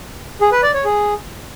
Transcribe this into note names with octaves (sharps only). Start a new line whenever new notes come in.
G#4
B4
D5
C#5
G#4